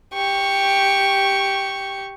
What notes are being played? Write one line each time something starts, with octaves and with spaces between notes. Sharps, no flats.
G4 C#6